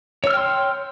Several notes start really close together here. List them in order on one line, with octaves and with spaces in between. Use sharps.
C#5 E6 F6 G5 C6